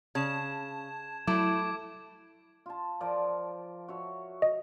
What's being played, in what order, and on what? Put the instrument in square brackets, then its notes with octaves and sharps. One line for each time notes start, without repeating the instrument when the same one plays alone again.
[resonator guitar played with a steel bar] C#3 [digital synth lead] A5 [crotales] G#6 E7
[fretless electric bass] F#3 [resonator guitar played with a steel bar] A3 [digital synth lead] E4 [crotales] D6 G#6 D7
[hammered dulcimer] F4 A5
F3 A#4 D5
F#4 C#5 E5
[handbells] D#5